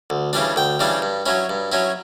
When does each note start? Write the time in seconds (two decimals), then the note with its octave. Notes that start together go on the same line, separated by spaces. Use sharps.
0.10 D2
0.33 C#3 E3 G3 D4
0.56 D2 G5
0.79 C#3 E3 G3 D4
1.02 G2
1.26 F#3 C#4 E4
1.49 G2
1.72 F#3 C#4 E4